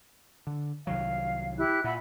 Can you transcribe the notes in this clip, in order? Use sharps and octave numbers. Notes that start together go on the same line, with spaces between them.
D3
C2 D#3 F#3 F5
E4 G4 F#6
A#2 E5 F#5 B5